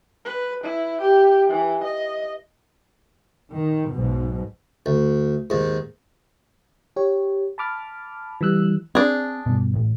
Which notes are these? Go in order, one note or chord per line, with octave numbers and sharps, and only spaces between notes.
B4
E4
G4
E3
D#5
D#3
B1 G#2 B2
D2
D#2 G#2
G4 C#5
A5 B5 D6 F6
E3 G3 E6 F#6
C4 D4 G#4
G2 B2
A1 A2